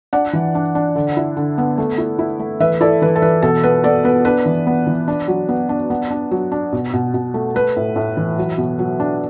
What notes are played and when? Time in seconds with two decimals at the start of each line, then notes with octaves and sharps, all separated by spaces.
0.13 D4 D5 F#5
0.33 E3
0.55 D4
0.75 D4
0.95 D3
1.17 E4
1.37 D3
1.58 B3
1.78 A3
1.98 E4
2.19 E4
2.39 A3
2.60 E3 B4 E5
2.81 E4 A4 D5
3.02 E3 B4
3.16 A4
3.22 E3 B4
3.42 B2 A4
3.63 B3 B4
3.84 B3 A4 D5
4.04 B3 B4
4.25 D4 B4
4.46 E3
4.67 B3
4.87 E3
5.08 D4
5.28 F#3
5.49 B3
5.69 D4
5.90 B3
6.11 D4
6.31 F#3
6.52 D4
6.73 B2
6.93 B2
7.14 B2
7.34 A3
7.55 A3 B4
7.77 A2
7.96 A2
8.17 E3
8.38 F#3
8.58 B2
8.79 F#3
9.00 D4